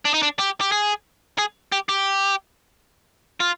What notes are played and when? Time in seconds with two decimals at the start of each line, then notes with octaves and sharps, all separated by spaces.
0.05 D4
0.14 D#4
0.23 D4
0.39 G4
0.61 G4
0.72 G#4
1.38 G#4
1.72 G4
1.89 G4
3.40 F4